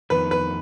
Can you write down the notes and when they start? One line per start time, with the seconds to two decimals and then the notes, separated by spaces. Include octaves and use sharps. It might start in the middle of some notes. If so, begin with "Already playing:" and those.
0.10 F2 D#3 B3 B4
0.31 B4